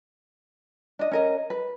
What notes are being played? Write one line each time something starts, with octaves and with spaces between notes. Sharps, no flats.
D4 D#5
C#4 A#4 D#5
B4